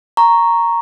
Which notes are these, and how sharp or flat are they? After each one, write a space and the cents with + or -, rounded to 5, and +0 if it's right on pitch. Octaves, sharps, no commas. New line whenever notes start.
A#5 +0 C#6 +0